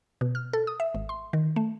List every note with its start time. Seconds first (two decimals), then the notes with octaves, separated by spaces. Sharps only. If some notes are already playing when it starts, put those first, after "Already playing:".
0.21 B2
0.35 F6
0.53 A4
0.67 D#6
0.80 E5
0.95 G#1
1.09 C6
1.33 D#3
1.56 A3